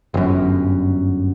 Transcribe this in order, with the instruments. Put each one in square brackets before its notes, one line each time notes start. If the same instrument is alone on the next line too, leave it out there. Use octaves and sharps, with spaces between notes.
[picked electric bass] G1 F#2